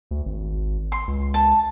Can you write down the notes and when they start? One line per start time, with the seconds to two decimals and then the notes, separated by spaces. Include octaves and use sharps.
0.11 D2
0.26 G#1
0.92 C6
1.07 C#2
1.34 A5